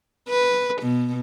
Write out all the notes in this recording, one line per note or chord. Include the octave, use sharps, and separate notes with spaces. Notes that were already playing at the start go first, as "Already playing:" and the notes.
B4
B2